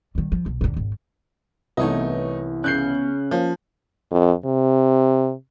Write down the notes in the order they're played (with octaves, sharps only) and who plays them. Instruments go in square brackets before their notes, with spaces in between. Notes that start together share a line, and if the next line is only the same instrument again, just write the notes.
[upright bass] D#3 G3
F3
B1
D#2 D3
G#1
[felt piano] C2 E3 [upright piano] A3 D#4 D#5 [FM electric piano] B3 E4 C#5
[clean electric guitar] C#3 C#4 [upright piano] F#6 G6 C7
[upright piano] F3 [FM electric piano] A#3 C#4 F4
[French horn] F2
C3